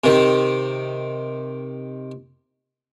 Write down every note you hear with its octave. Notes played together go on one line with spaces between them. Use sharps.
C3 D#3